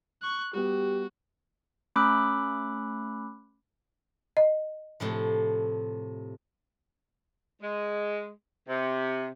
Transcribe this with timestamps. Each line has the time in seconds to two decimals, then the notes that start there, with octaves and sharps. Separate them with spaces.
0.22 C#6 F#6
0.54 G3 B3 F#4 G4
1.96 A3 C#4 B5 D6 E6 F#6
4.37 D#5
5.00 A2 C3 F3
7.62 G#3
8.67 C3